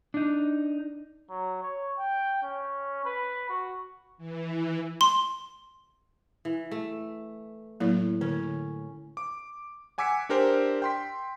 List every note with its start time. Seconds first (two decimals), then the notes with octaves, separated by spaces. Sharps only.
0.14 D4 D#4
1.30 F#3
1.63 C#5
1.98 G5
2.43 C#4
3.05 B4
3.50 F#4
4.18 E3
5.01 C6
6.45 E3
6.71 A3
7.80 A2 F#3 A#3
8.21 D3 C#4
9.17 D6
9.98 F#5 G#5 D6 E6 B6 C#7
10.29 D4 G4 A#4 C5
10.82 G5 C6 B6